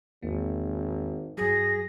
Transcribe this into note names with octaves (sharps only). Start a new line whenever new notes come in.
G#1 E2 A#3
G2 F#3 G#4 A#6